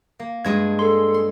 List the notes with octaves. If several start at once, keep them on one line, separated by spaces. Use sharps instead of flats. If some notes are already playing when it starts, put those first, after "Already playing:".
A#3
G2 G#3 G#4 G#6
A4 C6
C6